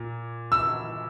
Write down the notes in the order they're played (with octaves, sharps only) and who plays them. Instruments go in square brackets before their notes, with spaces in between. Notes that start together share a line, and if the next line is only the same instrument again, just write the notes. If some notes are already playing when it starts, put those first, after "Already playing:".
Already playing: [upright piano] A#2
E6